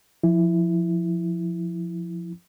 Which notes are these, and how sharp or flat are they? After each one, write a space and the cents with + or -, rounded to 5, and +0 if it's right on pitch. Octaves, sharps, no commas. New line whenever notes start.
F3 +0 E4 +0